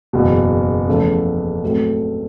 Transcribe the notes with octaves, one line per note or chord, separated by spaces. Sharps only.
F#1 E2 B2
E2 C#3 F3 A3 C#4
A2 F#3 A3 C4